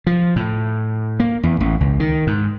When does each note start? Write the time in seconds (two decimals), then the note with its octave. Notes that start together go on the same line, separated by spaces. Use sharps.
0.07 F3
0.36 A2
1.20 A#3
1.43 E2
1.60 A1
1.81 C#2
2.00 D#3
2.27 G#2